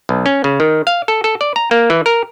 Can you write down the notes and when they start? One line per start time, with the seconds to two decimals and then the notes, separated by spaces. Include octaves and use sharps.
0.09 B1
0.26 C#4
0.44 C#3
0.60 D#3
0.87 F5
1.08 A4
1.24 A4
1.41 D5
1.56 A#5
1.71 A#3
1.90 E3
2.06 A#4